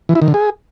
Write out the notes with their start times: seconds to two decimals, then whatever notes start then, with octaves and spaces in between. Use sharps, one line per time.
0.09 E3
0.15 E4
0.22 D#3
0.28 D3
0.34 G#4